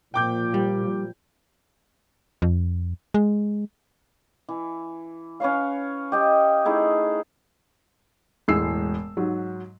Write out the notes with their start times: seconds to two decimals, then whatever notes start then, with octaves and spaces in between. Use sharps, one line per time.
0.14 A#2 F3 G5 D6 G6
0.54 G3
2.42 F2
3.14 G#3
4.49 E3
5.40 C#4 B4 C#5 F5
6.12 G4 D#5 G5
6.65 A3 D#4 E4 G#4
8.48 E1 A2 G#3 E6 C7
9.17 G#2 F#3